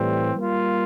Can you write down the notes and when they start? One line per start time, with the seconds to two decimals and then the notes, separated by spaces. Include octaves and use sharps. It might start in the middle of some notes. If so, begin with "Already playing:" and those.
Already playing: A2 E3 G3 C4
0.35 G3 A#3 F4